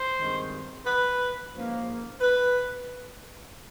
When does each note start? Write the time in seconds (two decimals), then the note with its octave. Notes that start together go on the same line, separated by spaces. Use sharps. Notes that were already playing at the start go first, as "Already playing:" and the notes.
Already playing: C5
0.17 G2 D#3 G#3 C4
0.86 B4
1.54 G#2 F3 A#3 C#4
2.21 B4